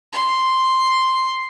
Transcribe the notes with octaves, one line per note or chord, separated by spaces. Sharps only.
C6